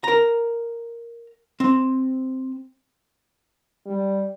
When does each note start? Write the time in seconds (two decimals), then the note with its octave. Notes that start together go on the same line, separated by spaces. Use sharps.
0.04 A#4 A#5
1.60 C4
3.86 G3